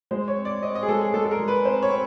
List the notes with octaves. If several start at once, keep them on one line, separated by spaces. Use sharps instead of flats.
G#3 C5
C#5
C4
D5
C4 D#5
D#5
G#4
G#3 A4
G#4
G#3 A4
A4
A#4
G#3
B4
C4 C5
C#5
C4